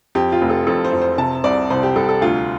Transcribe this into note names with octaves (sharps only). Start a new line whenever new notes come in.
F2 G4
F4
F1
A4
F2 A4
C5
F2
C5
C3 A5
C2 D5
C2 C5
G4
C2 A4
A4
D2 F4